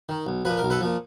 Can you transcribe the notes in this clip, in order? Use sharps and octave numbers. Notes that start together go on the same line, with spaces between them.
D#3
B1
A#2 F3 B4
A#4
B1
A4 B4
A#2 F3